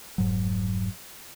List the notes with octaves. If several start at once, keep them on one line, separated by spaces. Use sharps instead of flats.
F1 G#2 F#3